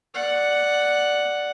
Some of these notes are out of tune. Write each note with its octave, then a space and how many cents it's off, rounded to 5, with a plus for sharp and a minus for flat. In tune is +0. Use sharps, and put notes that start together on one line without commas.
D5 +0 F#5 +0